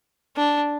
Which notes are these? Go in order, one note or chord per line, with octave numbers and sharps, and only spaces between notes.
D4